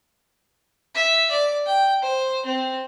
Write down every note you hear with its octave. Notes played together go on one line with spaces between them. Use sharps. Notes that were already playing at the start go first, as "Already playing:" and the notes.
E5
D5
G5
C5
C4